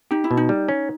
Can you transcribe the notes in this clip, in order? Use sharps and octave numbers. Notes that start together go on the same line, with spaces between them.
D#4 G4
E4
B2
D#4
G3
C#4